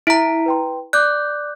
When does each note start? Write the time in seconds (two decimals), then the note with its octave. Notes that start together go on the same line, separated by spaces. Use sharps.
0.07 E4 E5 A#5 B6 D7
0.46 B4 G5 C6
0.93 D5 D6 F#6 G6